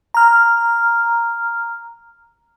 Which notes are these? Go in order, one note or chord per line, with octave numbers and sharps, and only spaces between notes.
A#5 F6